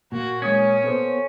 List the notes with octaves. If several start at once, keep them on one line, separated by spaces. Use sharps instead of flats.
A#2 A#3 F#4
G#3 C#4 C#5 D#6 G#6
B3 A4 C5